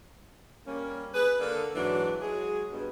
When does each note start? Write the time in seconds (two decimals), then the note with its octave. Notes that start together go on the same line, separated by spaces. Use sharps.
0.67 G3 A#3 C#4
1.14 G#4 B4
1.40 D3 A#3 D4 A4
1.75 G#2 E3 F#3 D4
2.22 F#3 G#3 G#4
2.72 G2 B2